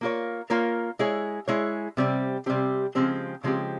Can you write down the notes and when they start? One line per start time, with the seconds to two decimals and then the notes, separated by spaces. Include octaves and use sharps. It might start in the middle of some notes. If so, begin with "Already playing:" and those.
0.01 A#3 F4 A#4 C#5
0.50 A#3 F4 A#4 C#5
0.99 G#3 E4 G#4 C#5
1.48 G#3 E4 G#4 C#5
1.97 C3 G3 C4 G4
2.46 C3 G3 C4 G4
2.95 C#3 F3 G#3 C4 G4
3.43 C#3 F3 G#3 C4 G4